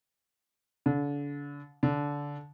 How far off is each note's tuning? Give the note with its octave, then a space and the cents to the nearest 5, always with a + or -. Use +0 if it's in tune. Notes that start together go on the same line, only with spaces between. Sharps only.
D3 -35
D3 -20